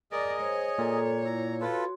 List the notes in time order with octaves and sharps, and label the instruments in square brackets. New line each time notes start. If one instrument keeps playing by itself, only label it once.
[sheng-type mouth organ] G#4 D#5 [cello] A#4 D5
[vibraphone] C5 [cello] C#5
[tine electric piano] A#2 [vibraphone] A4 A#5
[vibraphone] E4 [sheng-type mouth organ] A#5
[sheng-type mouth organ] F4 A4 B4 [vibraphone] F#4 C6